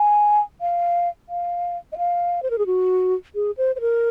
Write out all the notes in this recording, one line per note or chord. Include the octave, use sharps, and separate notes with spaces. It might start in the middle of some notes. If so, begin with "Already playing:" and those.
Already playing: G#5
F5
F5
D#5
F5
C5
A#4
G#4
F#4
G#4
C5
C5
A#4